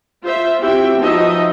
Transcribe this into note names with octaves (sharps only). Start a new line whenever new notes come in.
F4 C5 E5
C4 E4 F#4 G4 E5 G5
F3 B3 D#4 F#4 D#5 E5